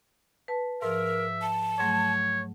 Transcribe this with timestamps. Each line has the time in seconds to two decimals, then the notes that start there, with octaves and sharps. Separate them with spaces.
0.48 B4 A5
0.82 G#2 F3 A#4 E5
1.42 A5
1.79 G#2 F#3 A3 C#5